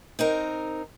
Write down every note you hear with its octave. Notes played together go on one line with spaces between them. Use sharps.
C4 D#4 A#4